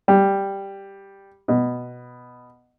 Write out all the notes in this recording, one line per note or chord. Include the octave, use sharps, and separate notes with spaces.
G3
B2